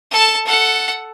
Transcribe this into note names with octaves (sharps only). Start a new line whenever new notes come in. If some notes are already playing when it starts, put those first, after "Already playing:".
A4 A5
A4 F#5